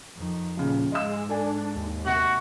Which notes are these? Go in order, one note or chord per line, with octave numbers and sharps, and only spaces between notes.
F2 D#3
D#2 A#2 C#3 F3
G#2 G#3 D#5 F5 E6
D4 A4 D5 G#5
D#2
C3 A#3 F#4 F#7